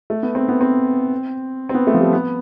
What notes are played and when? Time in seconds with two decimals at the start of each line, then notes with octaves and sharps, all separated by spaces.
0.10 A3
0.23 B3
0.35 C4
0.48 B3
0.61 C4
1.69 C4
1.74 B3
1.87 A3
1.94 F3
2.00 G3
2.13 B3